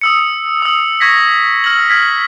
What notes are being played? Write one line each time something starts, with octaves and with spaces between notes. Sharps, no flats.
D#6 E6 C#7
D#6 E6
C#6 G#6 A#6 B6
E6 F6 G#6 F#7
F6 G#6 B6